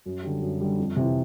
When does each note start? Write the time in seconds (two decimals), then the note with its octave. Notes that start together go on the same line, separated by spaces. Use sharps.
0.06 F#2
0.23 D3 G3
0.41 F#2
0.60 D3 G3
0.78 F2
0.96 C3 E3